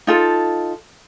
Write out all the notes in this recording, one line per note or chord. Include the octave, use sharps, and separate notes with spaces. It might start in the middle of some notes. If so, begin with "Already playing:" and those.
D#4 F4 A4